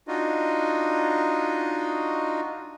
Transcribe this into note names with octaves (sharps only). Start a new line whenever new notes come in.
D4 D#4 F4 F#4 D#5